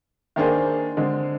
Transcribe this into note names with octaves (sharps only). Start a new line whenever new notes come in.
D#3 A#3 D4 G#4 C5
D3 G#3 C4